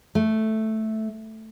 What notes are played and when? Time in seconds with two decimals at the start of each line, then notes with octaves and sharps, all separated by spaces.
0.15 A3